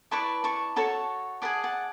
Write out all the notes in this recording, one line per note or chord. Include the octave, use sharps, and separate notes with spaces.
E4 B4 D5 A5 C#6
A5 C#6
F#4 A4 C#5 A5 C#6
G#4 B4 D5 F#5 A5
F#5 A5